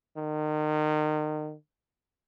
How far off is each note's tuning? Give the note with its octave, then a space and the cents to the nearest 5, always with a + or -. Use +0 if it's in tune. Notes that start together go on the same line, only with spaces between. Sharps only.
D#3 -30